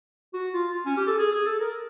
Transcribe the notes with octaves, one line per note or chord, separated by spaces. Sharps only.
F#4
F4
C#4
G4
A4
G#4
G#4
A4
A#4